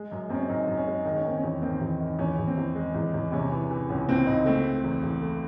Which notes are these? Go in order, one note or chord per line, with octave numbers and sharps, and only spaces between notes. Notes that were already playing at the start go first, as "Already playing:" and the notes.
Already playing: G#3
F#2
F#2 C4 C#4
F#2 D#4
F#2
C#4
G#3
D#3 D#4
C#4
D#3 C4
C#4
E2
D#3 C4
E2
D#3
E2 C#4
E2
C4
E2
G#3
E2
E2
C3 C#4
E3
E3
C#2 C#4
C#2 C4
C#2 D#4
A3 C4
A3
E2
E2
A3